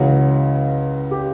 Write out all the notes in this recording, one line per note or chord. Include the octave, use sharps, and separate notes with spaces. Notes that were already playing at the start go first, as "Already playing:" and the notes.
Already playing: C#2 C#3 E3 F#4
G4